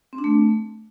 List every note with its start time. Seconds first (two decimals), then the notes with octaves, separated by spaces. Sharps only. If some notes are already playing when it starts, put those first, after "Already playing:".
0.13 C4
0.18 D4
0.24 A3